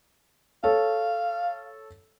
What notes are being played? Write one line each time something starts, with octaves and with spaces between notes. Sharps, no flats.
A4 C#5 F5